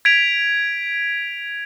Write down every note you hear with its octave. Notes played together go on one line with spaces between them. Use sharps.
G#6 B6 D7 F7